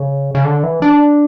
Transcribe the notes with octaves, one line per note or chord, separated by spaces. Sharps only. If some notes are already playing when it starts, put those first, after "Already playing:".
Already playing: C#3
C#3
D3
E3
D4